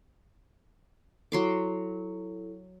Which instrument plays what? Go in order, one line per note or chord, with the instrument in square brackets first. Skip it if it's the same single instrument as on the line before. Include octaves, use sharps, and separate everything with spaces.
[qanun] F#3 C6 D6 [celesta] E4 A4